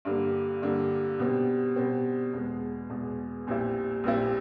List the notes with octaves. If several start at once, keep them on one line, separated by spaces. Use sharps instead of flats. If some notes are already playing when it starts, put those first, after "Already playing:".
G2 D3 G3 A#3
G2 D3 G3 A#3
B2 G3 C4
B2 G3 C4
E2 B2 G#3
E2 B2 G#3
A#1 A#2 G3 C4 E4
A#1 A#2 G3 C4 E4